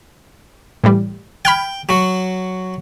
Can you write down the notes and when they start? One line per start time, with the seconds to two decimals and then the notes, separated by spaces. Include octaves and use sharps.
0.84 A2 E3 G3
1.45 G5 B5 F6 G#6
1.89 F#3 F#4